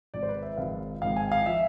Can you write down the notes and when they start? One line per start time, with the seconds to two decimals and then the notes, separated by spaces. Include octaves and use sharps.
0.14 G#1 G#2 F3 D5
0.23 C5
0.29 B4
0.42 E5
0.58 G#1 G#2 F3 F5
1.02 G#1 G#2 F3 F5
1.17 G#5
1.32 F5
1.46 F3 E5